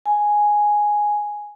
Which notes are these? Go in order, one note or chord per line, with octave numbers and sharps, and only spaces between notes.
G#5